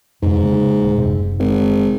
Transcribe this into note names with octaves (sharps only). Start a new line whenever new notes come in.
F2 G#2 C3
C#3 A#3
D#1
F#1 C3
G#1